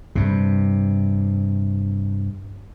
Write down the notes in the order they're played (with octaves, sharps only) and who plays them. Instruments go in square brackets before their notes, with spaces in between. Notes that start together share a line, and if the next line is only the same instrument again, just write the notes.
[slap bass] G2 C3